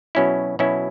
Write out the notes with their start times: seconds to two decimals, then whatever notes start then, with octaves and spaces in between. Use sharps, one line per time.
0.15 B2 F#3 C#4 E4
0.59 B2 F#3 C#4 E4